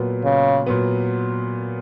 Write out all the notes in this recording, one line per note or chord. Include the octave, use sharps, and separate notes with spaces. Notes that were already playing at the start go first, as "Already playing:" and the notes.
Already playing: A#2 F#3 B3
C#3
A#2 F#3 B3